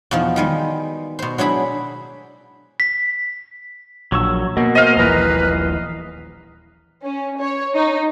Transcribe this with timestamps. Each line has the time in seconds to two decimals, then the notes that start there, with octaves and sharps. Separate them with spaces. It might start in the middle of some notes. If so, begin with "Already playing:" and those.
0.11 E2 B2 F3 D#4
0.36 D#3 G3 G#3
1.19 B2 C5
1.38 F#3 D4 E4 G#4 B5
2.80 B6
4.12 A#1 F#3 C#6 E6
4.57 B2 A#3
4.75 C5 D#5 F5
4.97 D#1 A#1 E3 B4 A#5
7.03 C#4
7.39 C#5
7.75 D#4